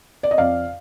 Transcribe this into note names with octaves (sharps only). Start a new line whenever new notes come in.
D5
D#5
F2 D5 F5